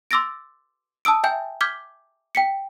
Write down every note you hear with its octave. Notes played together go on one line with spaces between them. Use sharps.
C6 D6 E6 A6 A#6 D7
A5 D#6 E6 D7
E5 G5 G#5 G6
D6 F6 G6 G#6 B6 G7
G5 B6 C#7